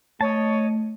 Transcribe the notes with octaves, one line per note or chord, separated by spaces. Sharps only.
A3 C#5 D#5 A5